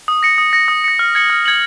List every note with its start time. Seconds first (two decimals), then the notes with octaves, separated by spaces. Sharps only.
0.08 D#6
0.23 A#6 C#7
0.38 D#6
0.53 A#6 C#7
0.68 D#6
0.84 A#6 C#7
0.99 F6
1.15 G#6 C#7 F#7
1.30 F6
1.45 G#6 C#7 F#7